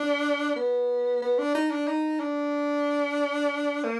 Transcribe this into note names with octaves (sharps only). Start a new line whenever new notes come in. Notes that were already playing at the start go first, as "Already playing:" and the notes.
Already playing: D4
B3
B3
D4
D#4
D4
D#4
D4
A#3